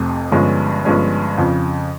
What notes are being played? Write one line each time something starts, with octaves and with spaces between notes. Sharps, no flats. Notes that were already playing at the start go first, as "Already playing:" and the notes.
Already playing: F1 F2 C3
G1 G2 F3 G#3 C#4
G1 G2 F3 G#3 C#4
F2 C#3 F3